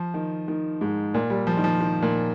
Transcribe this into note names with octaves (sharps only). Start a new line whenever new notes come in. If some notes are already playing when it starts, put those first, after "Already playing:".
Already playing: F3
D#3
D#3
G#2
A#2
G3
F3
D#3
F3
D#3
A#2